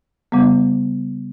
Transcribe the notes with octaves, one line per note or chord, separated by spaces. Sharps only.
C#3 G3 B3